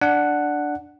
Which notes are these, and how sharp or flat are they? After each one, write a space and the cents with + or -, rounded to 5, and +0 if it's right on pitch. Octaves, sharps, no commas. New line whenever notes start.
D4 +0 F#5 +0